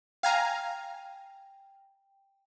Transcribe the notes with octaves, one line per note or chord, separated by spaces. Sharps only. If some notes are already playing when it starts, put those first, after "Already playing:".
F5 G5 G#5 A#5